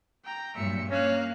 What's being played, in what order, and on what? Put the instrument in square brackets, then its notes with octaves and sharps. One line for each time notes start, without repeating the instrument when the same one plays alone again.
[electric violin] G5 A#5
[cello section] G2 A#2 F#3 [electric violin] E5 C#7
[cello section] A#3 [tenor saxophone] C#4 [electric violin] F5 F#6